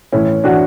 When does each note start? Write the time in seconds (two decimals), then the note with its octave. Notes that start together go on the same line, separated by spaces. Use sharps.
0.13 A2 E3 C#4 E4
0.44 A2 E3 D4 F#4